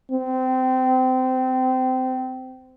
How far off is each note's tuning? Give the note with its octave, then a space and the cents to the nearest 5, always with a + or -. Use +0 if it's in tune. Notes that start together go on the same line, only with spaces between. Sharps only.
C4 -25